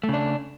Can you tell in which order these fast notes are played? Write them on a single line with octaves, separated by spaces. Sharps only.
A3 C#3 D4